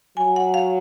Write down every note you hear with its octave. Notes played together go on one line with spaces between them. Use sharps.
F#3 G#5
F#5
F5